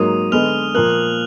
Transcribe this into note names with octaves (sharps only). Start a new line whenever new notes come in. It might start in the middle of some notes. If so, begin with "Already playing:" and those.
Already playing: G#2 F#3 A#3 D#6 D#7
D3 G#3 B3 F6 F7
A#2 F3 A#3 F#6 F#7